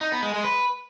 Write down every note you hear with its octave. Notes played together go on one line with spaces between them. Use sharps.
D#4
B3
G#3
G#3
B4